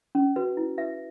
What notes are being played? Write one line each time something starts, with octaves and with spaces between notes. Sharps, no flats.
C#4
F#4 B4
E4
B4 E5